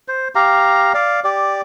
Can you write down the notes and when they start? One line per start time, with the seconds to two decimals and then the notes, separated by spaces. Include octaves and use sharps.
0.08 C5
0.35 G4 F5 A#5
0.94 D5 F5
1.24 G4 D5